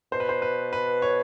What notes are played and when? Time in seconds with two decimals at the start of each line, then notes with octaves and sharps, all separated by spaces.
0.12 B2 C5
0.20 B4
0.29 C5
0.42 B4
0.73 B4
1.02 C#5